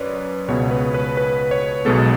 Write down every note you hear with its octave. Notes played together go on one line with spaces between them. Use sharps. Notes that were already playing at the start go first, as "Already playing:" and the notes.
Already playing: F#2 B4 C#5 D5
C#2 B2 G#3 B3 C#5
B4
B4
B4
C#5
B1 B2 G#3 B3 A4